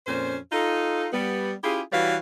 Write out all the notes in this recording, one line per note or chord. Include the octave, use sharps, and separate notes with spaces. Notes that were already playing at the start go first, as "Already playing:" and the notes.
F2 A#2 C#4 C5
D#4 F4 A4
G3 B3
C#4 E4 F4 G4 G#4
E3 G3 F#4 B4 C#5 F5